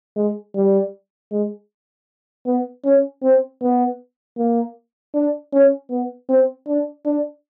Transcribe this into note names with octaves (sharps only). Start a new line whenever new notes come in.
G#3
G3
G#3
B3
C#4
C4
B3
A#3
D4
C#4
B3
C4
D4
D4